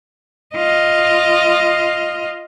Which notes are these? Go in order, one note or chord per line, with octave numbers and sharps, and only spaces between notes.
F4 D#5